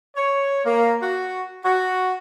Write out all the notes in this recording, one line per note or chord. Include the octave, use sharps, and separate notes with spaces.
C#5
A#3
F#4
F#4